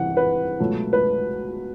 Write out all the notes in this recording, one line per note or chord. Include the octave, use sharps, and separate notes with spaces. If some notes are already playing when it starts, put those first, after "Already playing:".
Already playing: C2 C3 E3 F#5
B4
C#2 B2 F#3 A3
B4